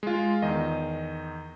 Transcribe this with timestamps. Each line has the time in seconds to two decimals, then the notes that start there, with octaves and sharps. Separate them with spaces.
0.03 G#3 F4
0.42 E2 D#3 D#5